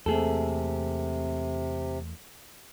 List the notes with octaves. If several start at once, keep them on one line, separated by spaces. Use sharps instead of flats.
E2 C3 A3 A#3 G#4 A4